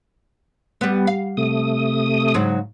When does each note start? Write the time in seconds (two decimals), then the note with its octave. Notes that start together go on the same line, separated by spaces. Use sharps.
0.81 G3 B3
1.07 F5
1.37 C3 A3 D#6
2.34 G#2 C#3 F#3